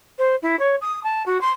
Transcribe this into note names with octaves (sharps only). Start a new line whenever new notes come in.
C5
E4
C#5
D#6
A5
F#4
C6